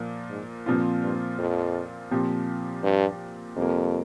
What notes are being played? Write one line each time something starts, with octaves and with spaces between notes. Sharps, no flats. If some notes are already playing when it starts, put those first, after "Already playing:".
Already playing: A#2 F3 A#3
G#2
G2 A#2 F3 C4 F4
G2
F2
A#2 F3 C4 G4
G2
F2 C3 G3 A#3